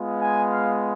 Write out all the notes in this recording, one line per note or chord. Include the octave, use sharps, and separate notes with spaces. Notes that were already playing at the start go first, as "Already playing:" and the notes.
Already playing: G#3 B3 F4
G#5
F5